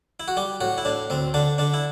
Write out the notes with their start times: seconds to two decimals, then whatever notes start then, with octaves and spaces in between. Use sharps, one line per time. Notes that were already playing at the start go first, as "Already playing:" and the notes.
0.20 E4
0.28 F#4
0.37 G3 G4
0.61 A2 F#4
0.78 E4
0.85 A2 D4
1.10 D2 C4
1.34 D3 D4
1.58 D3 D4
1.74 E4